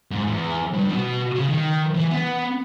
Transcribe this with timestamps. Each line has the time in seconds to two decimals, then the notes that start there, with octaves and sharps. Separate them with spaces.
0.11 G#2
0.27 E2
0.73 G2
0.88 B2
1.35 C#3
1.49 D#3
1.95 E3
2.11 B3